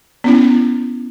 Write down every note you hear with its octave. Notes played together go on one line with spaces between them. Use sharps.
B3 C#4 E4